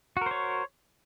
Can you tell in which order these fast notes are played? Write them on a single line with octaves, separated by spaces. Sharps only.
F#4 A#4 C5 C#5